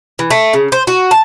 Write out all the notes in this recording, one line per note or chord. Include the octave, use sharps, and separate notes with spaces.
E3
A3
C#3
C5
F#4
A5